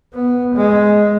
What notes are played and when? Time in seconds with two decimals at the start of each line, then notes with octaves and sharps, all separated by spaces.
0.14 B3
0.56 G#3